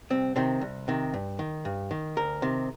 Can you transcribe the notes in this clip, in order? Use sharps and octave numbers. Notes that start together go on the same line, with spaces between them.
C2 C4
C3 D#3 C4
C2
C3 D#3
G2
D#3
G2
D#3
D2 A#4
C3 D#3